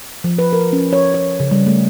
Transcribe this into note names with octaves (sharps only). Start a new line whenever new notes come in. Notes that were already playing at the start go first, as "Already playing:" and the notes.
F3
B4
A#4
C#4
C#5
C#5
C#3
G3
A3